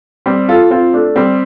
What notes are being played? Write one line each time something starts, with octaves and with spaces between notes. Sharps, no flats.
G3 C4
F4 A4
C4 F4
A3 D4
G3 C4